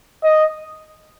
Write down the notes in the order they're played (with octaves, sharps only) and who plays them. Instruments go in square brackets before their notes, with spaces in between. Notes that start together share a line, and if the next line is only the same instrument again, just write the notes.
[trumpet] D#5